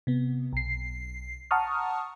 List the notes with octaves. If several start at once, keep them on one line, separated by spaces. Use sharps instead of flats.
C3 B3
B1 C7
F#5 A5 A#5 C#6 D#6 F6